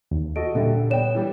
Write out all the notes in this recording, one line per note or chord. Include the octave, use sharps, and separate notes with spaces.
D#2
F#4 A4 D#5 D7
A#2 D3 G3 A4 E5 G5
B3 C#5 D5 G5 E7
E3 G3